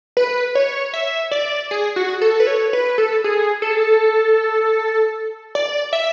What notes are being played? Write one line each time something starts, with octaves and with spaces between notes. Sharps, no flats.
B4
C#5
E5
D5
G#4
F#4
A4
B4
C#5
B4
A4
G#4
A4
D5
E5